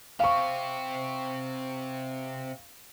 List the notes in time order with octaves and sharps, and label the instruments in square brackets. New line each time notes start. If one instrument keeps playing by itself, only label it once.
[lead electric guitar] C3 C4 [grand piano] F5 C#6